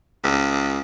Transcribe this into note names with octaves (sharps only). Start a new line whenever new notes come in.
C#2